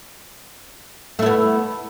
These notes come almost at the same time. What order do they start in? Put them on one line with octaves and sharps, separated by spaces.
A3 E4 B3